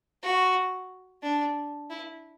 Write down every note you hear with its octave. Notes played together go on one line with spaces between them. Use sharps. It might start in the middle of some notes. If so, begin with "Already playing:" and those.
F#4
D4
E4